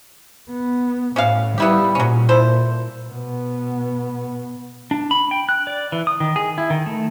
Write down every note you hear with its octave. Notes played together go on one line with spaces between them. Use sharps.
B3
A2 C#4 F#4 F5
G3 B3 E4 G4
A#2 F#3 C#4
E4 A4 C5
B2 B3
D4
B5
G5
F#6
D5
E3
D#6
D#3
G#4
E4
D#3
A3